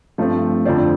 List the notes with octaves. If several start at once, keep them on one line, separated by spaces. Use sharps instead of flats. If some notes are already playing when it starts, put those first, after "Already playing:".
G2 F3 A3 C4 C5
F2 D3 F3 C4 D5